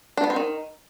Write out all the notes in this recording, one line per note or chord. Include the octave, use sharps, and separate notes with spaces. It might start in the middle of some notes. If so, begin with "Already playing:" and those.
D4
B3
C4
D#3